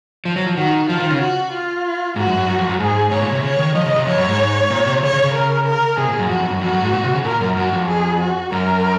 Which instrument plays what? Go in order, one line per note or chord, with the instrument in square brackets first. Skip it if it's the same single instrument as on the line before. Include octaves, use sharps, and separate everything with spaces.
[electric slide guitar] F3
F#3
F3
[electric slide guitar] D#3 [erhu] F#4
[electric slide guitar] F3 [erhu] F4
[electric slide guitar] D#3
C#3
[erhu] F#4
F4
[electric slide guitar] G#2 [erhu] F#4
[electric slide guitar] F#2
F#2
F#2
F2
F#2
[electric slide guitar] G#2 [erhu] G#4
[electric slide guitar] G#2 [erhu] C#5
[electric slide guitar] A#2
C3
[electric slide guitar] C#3 [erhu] C#5
[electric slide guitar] D#3
[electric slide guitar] F3 [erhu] D#5
[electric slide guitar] C#3
C3
[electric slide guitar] F2 [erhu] C#5
[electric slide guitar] F#2
G#2
A#2
C3
[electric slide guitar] C#3 [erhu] C#5
[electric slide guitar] C#3
C#3
[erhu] A#4
A#4
[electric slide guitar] C3 [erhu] G#4
[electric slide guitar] A#2
F#2
[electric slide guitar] F2 [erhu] F#4
[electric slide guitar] F2
F#2
[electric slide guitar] F2 [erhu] F#4
[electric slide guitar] F#2
G#2
A#2
C3
C#3
[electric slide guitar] A#2 [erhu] A#4
[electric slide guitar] F#2
[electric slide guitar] F#2 [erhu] F#4
[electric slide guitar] F2
[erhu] G#4
F#4
[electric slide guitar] F#2 [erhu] A#4